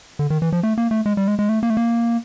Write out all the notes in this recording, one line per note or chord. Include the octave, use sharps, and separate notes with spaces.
D3
D#3
E3
F3
A3
A#3
A3
G#3
G3
G#3
G#3
A3
A#3
A3
A#3